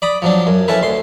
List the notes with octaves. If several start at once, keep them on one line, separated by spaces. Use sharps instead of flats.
D5 B5 D#6
F3 F#3 D4
F#2
C#4 E4 A4 B4
D2 C6